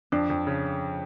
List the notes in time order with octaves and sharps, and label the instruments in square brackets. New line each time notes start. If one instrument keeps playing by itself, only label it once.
[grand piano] F2 [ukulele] D4
[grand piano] F2
C#3